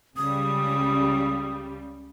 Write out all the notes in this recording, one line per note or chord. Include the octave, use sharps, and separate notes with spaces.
C#2 C#3 G3 D#6